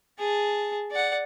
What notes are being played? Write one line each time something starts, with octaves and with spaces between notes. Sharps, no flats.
G#4 A5
D5 F#5